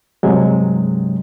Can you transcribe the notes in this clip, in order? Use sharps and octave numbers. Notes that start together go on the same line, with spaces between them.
G2 C3 F#3 G#3